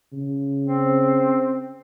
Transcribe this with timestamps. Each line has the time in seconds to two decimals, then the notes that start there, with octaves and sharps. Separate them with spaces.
0.13 C#3
0.63 C4